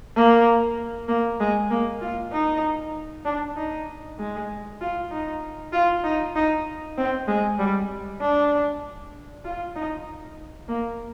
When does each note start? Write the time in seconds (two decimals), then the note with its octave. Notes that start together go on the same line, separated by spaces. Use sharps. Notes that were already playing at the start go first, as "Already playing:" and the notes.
0.16 A#3
1.08 A#3
1.40 G#3
1.71 A#3
2.01 F4
2.32 D#4
3.25 D4
3.56 D#4
4.19 G#3
4.81 F4
5.11 D#4
5.73 F4
6.04 D#4
6.36 D#4
6.98 C4
7.28 G#3
7.59 G3
8.21 D4
9.45 F4
9.76 D#4
10.68 A#3